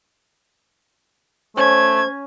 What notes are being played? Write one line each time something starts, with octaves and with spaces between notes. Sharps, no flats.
A3 C#4 C5 G#5 G#6